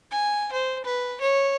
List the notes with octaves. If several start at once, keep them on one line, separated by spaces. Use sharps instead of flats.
G#5
C5
B4
C#5